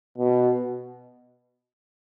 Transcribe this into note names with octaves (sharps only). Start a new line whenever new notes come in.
B2